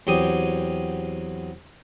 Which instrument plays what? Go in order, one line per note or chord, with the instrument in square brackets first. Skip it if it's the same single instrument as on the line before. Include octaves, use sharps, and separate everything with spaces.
[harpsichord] E2 F#3 C4 G4 D#6